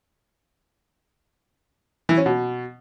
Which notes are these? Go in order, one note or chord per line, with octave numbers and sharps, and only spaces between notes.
E3
C#4
B2